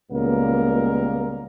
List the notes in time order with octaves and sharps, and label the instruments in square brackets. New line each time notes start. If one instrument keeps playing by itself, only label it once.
[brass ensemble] C#2 A#2 G3 A#3 B3 A#4